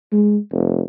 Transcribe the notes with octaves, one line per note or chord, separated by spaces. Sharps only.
G#3
F1